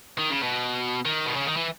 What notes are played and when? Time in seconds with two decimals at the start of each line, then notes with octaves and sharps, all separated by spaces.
0.18 D#3
0.30 C#3
0.43 B2
1.06 D#3
1.26 B2
1.36 C#3
1.47 D#3
1.57 E3